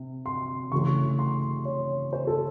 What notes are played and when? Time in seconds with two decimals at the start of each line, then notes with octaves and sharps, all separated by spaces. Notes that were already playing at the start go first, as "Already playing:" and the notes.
Already playing: C3
0.26 C6
0.72 C#3 E3 A3 C#4 C#6
1.19 C6
1.65 C#5
2.13 C5
2.27 A4